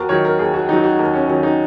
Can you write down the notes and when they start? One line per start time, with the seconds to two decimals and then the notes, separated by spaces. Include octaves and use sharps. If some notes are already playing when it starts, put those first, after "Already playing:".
Already playing: D#2 F#4 A#4
0.09 D#3 F#3 C#5
0.25 A#4
0.38 D#2 G#4
0.54 F#4
0.68 D#3 F#3 D#4
0.84 F#4
0.99 D#2 A#4
1.14 C#4
1.28 D#3 F#3 C#4
1.43 D#4